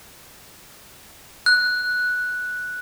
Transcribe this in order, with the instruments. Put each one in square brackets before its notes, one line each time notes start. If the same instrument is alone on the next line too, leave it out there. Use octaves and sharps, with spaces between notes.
[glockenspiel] F#6